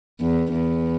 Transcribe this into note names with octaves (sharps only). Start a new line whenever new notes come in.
E2
E2